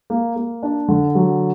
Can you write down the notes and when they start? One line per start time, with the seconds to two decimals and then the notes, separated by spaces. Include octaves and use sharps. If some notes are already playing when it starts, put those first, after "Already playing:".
0.10 A#3
0.36 A#3
0.63 D4
0.88 D3
1.15 F#3